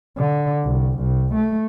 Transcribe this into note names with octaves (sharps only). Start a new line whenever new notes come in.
D3
C2
C2
A3